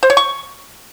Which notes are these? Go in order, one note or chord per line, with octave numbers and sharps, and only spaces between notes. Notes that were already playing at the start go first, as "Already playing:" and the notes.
C5
C#5
C#6